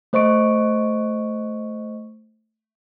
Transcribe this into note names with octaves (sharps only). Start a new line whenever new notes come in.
A3 C5 D#5 C#6 D7